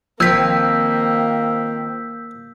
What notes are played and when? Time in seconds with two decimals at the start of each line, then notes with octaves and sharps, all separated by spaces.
0.20 A#1 D#3 F3 A#3 C4 E6 G6 B6